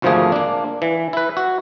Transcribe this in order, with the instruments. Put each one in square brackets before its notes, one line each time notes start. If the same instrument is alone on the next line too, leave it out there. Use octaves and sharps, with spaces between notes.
[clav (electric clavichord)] G#1 D2 F3 A3 A#3 G#4
A#3 D4
E3
E4 B4
F#4